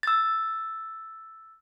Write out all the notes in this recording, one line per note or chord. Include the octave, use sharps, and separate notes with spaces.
E6 A6